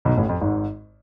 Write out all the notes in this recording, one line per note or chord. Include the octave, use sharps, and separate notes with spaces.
B1 B2
A1 A2
F2
G#1 G#2